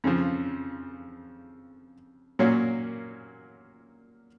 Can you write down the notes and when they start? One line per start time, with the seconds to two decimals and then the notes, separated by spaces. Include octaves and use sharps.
0.04 F2 C#3 F3
2.39 A#2 F#3 A#3 C#4